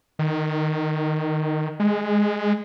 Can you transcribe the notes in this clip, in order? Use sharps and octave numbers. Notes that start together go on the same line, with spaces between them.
D#3
G#3